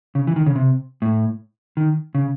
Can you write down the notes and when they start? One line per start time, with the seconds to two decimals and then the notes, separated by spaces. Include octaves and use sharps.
0.15 C#3
0.27 E3
0.36 D#3
0.46 C#3
0.56 C3
1.02 A2
1.77 D#3
2.15 C#3